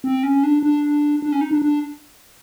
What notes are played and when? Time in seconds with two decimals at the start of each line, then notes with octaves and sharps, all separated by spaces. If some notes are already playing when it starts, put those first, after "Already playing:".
0.04 C4
0.23 C#4
0.44 D4
0.63 D4
1.22 D4
1.32 C#4
1.41 D#4
1.51 D4
1.62 D4